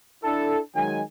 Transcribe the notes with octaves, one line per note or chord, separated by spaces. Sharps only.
D4 E4 A4
D#3 F#3 G#3 G#5